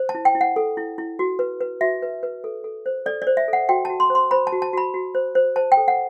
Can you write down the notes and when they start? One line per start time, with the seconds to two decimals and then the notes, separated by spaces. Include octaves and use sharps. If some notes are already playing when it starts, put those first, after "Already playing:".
Already playing: C5
0.09 A5
0.15 E4
0.25 G5
0.35 E4
0.41 F#5
0.56 A4
0.77 E4
0.98 E4
1.19 F#4
1.39 B4
1.61 B4
1.81 F#4 E5
2.02 B4
2.23 B4
2.44 A4
2.64 A4
2.86 C5
3.06 A4 D5
3.22 D5
3.27 C5
3.37 E5
3.48 A4 F#5
3.69 F#4 G5
3.85 F#4 A5
4.00 C6
4.10 C5
4.15 C6
4.31 C5 B5
4.47 A5
4.52 F#4
4.62 A5
4.73 F#4 B5
4.94 F#4
5.15 C5
5.35 C5
5.56 C5 A5
5.72 G5
5.77 A4
5.88 F#5